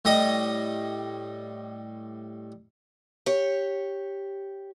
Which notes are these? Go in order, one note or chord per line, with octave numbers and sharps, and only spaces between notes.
A2 G3 D#5 D#6
G4 C#5